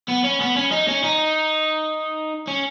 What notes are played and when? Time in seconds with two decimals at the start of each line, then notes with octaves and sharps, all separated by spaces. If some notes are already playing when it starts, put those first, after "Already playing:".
0.09 B3
0.24 C#4
0.41 B3
0.57 C#4
0.72 D#4
0.88 C#4
1.04 D#4
2.47 C#4